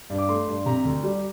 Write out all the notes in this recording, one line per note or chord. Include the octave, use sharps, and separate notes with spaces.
G2
D6
A3 C6
G2
C3 A#5
D2
G3